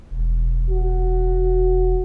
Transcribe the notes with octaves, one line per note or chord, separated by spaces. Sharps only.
E1
F#4